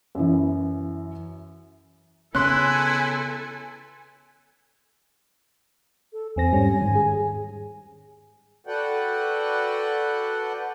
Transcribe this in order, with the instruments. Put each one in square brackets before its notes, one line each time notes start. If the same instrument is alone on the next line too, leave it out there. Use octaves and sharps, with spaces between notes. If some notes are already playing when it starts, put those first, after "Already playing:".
[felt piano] F#2 E3
[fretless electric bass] C#3 B3 C#4 [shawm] E4 [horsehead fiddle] A4 G#5 [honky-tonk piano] C6 F#6
[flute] A4
[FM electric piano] E2 C4 A#6 [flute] G#5
[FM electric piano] G#2 G3 C#4
G#2 D#3
G#4
[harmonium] F#4 A4 B4 D5 F#5 G5